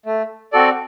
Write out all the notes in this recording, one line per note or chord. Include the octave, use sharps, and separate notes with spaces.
A3
C4 F#4 A4 D5